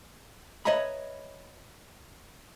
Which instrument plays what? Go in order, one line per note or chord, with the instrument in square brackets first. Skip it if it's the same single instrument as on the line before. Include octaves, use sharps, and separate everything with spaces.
[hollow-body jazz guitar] B4 C#5 D#5 E5 A#5 B5